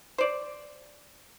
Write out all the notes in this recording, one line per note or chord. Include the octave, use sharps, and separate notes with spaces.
C5 D5